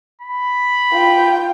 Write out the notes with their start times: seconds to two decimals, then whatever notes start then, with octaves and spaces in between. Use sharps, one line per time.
0.22 B5
0.93 F4 G5